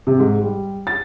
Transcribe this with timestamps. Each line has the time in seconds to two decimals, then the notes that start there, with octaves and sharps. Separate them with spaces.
0.07 C3
0.19 G#2
0.42 G3
0.87 A6